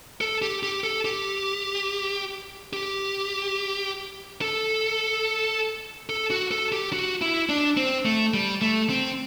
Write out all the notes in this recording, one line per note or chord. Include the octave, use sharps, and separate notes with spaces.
A4
G4
G4
A4
G4
G4
A4
A4
F#4
A4
G4
F#4
E4
D4
C4
A3
G3
A3
C4